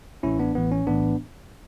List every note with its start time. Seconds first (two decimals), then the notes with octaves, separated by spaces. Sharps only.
0.23 A1 A2 E3 C#4 E4
0.39 B3 D4
0.55 A1 A2 E3 B3
0.71 C#4
0.87 B1 A2 E3 B3 D4